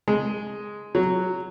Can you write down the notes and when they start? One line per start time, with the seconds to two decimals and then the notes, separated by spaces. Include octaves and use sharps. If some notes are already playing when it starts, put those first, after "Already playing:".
0.08 G#3
0.95 F#3